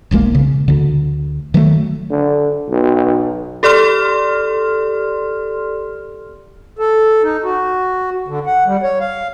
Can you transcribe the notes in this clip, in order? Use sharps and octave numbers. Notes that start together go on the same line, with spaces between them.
E1 B1 G#3 A#3
C#3
D2 D3
D#3 F#3 A3
D3
B1
G4 A4 D5 C6 F6
A4
D#4
F#4
D3
F#5
G3
C#5
F5